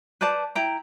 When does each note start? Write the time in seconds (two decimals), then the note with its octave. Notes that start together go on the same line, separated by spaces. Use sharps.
0.21 B4 C5 D5 A5
0.55 E4 G5 A#5